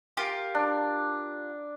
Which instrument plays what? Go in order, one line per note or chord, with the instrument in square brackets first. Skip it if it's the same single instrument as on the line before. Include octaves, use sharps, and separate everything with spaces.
[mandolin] F4 G4 A#4
[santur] D4